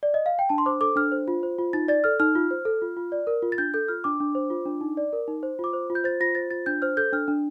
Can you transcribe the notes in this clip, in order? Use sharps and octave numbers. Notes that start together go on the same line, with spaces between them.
D5
D#5
F5
G5
D4 A5
C6
C5 D6
A4 D6
D4 F6
C5
F4
C5
F4
D#4 A6
D5 A6
A4 F6
D#4 F6
F4
C5
A4
F4
F4
D5
A#4
F4
A6
D4 G6
A4 G6
F4 F6
D4 D6
D4
C5
F4
D4
D#4
D5
A#4
D#4
C5
F4 D6
C5
F4
G6
C5 A6
F4 A#6
C5 A6
F4 A6
D4 G6
C5 F6
A4 G6
D4 F6
D4